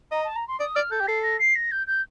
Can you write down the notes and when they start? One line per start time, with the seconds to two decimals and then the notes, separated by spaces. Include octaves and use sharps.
0.12 D#5 A#5
0.24 A5
0.36 A#5
0.48 C6
0.60 D5 D#6
0.75 D5 F6
0.91 A4 G6
1.01 G4
1.07 A4 C7
1.23 A#6
1.39 C7
1.55 A#6
1.72 G6
1.87 G6